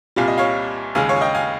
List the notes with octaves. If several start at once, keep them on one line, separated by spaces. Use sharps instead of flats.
C2 A#2 G3 F5
D#5
C#5 F5
D#2 C#3 G#3 F5 G#5
C#5 F5
G#5
D#5 G5
F5 G#5